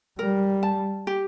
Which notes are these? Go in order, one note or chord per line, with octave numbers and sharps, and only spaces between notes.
G3 A#4
A5
G4